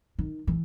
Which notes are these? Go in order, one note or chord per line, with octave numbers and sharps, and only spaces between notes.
D#3
E3